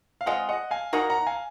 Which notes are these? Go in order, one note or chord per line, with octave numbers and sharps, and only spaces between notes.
F5
G#3 C4 F4 D#5 F#5
D#5 F#5
F5 G#5
A#3 D#4 F#4 A#4 F#5 A#5
F#5 A#5
F5 G#5